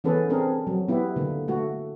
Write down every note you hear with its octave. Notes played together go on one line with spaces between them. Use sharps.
E3 B3 C#4 G#4 A4 B4
C4 D4 G#4 A#4
F#3
B3 E4 G4
D3 A#3
A3 F#4